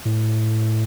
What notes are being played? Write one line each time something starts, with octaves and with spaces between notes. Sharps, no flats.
A2